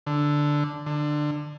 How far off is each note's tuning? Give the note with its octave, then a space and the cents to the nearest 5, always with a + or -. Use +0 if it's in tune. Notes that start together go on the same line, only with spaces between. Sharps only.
D3 +0
D3 +20